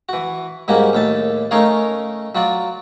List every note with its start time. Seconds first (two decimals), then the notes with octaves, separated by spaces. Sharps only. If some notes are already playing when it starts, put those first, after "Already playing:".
0.09 E3 F#4
0.68 G#2 G3 A#3 C#4 F#4
0.93 D#2 A2 A5
1.51 A3 C#4 D#4 A#4 C#5 F5
2.35 F#3 F4 F#4 D5